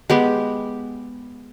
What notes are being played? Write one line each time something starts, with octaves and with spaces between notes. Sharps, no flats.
G#3 B3 G4